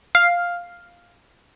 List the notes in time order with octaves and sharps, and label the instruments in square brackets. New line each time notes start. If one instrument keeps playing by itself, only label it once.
[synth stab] F5